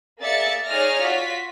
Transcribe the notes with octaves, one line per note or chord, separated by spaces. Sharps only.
A#3 G#4 D5 E5 A6 C#7
D#4 G#4 C#5 D5 F6 A#6
F4 F#4 B6